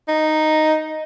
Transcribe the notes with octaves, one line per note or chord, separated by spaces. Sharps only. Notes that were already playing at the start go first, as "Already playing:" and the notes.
D#4